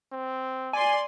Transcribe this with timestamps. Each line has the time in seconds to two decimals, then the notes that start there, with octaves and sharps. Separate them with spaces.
0.12 C4
0.73 D5 G#5 C6